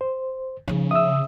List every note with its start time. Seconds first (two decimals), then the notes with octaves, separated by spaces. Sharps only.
0.01 C5
0.68 C#3 F3 D#4
0.91 E5 D#6 E6